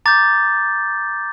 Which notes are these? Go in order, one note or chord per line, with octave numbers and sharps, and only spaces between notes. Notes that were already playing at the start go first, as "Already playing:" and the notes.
A#5 D6 G6 A6